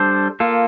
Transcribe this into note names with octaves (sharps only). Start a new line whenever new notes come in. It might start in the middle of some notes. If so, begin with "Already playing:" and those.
Already playing: G3 D4 A4 C5
A#3 F4 A4